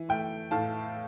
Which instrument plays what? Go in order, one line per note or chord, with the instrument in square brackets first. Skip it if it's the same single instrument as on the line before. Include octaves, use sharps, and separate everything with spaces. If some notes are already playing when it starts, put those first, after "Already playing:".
Already playing: [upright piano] E3
A3 G5
A2 F5 A5